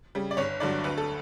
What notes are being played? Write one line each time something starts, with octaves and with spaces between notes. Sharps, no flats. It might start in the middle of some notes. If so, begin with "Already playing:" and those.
C#3 G3
D5
G1 C#5
G2 D3 F#3 D5
D2 B4
A4